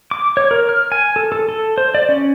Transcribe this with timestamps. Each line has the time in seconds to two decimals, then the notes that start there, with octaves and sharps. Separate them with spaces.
0.11 D6
0.37 C#5
0.51 A#4
0.69 F6
0.92 G#5
1.16 A4
1.32 A4
1.49 A4
1.78 C5
1.94 D5
2.09 C#4